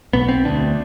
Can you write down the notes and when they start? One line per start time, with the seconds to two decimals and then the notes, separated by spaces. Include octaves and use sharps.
0.13 B1 B2 B3
0.28 C4
0.45 D2 D3 D4